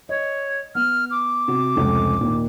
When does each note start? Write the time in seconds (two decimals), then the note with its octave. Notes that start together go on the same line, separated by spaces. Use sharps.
0.09 C#5 D#5
0.75 B3 F6
1.11 D6
1.48 C3 F#4
1.76 F1 C#2 A3
2.21 D#2 A#2